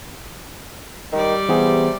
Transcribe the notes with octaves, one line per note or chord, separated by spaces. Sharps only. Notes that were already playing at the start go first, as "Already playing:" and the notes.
D#3 G3 D5
C3 E3 B3 G#4